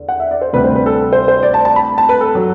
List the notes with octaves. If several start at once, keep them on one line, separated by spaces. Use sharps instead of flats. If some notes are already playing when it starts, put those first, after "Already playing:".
Already playing: E2 D3
F#5
E5
D5
C5
D2 C3 G3 B4
C5
B4
A4
C5
C5
D5
A5
A5
B5
A5
B4
A4
F#3